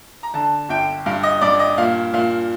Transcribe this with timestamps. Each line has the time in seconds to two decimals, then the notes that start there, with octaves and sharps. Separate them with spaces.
0.23 A#5
0.34 D3 A5
0.69 G1 G5
1.06 G2 F5
1.23 D#5
1.41 G2 D5
1.59 D#5
1.78 A#2 F5
2.14 A#2 F5